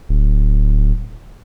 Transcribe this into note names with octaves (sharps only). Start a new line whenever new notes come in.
D1